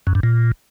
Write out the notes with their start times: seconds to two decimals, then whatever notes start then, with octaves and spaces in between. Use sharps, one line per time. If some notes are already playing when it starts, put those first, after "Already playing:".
0.07 F#2
0.15 G2
0.23 A#2